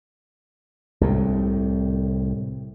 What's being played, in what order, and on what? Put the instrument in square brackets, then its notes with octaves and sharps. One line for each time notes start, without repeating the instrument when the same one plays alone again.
[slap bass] C2 A2 C3